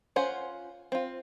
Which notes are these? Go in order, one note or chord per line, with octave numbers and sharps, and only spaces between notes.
C#4 F4 C5 F#5
C4 F4